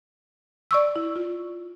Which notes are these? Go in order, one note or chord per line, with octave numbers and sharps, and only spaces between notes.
D5 C#6 E6
E4
F4